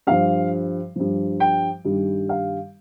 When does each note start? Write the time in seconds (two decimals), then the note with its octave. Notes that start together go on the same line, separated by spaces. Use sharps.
0.07 G2 F3 F5
0.96 G2 F3
1.40 G5
1.85 G2 D#3 G3
2.29 F5